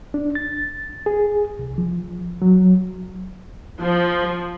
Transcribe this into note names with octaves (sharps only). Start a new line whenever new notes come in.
D4
A6
G#4
C2
F3
F#3
F3